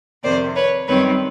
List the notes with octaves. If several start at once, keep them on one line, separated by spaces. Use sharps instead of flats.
F2 C3 D#3 C5 D5
B4 C#5
F#2 D#3 G3 C4 B4 C#5